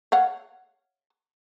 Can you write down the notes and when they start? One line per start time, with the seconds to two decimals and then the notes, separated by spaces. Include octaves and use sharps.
0.12 C#5 F5 F#5